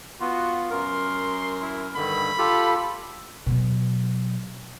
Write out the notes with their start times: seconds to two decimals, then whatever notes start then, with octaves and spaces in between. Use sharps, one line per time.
0.21 B3 F4 F#4
0.70 F#2 A#4 C6
1.62 E4
1.96 G2 D3 D#3 B5
2.38 F4 G4 A4
3.46 B2 F#3